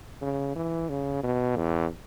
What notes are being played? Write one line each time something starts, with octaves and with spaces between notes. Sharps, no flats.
C#3
E3
C#3
B2
E2